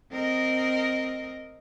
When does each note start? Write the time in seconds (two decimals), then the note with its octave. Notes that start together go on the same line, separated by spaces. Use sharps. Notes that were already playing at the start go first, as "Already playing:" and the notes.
0.11 C4 A#4 D#5